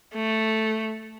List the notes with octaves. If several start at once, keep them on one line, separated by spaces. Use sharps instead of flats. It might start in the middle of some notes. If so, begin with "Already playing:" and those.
A3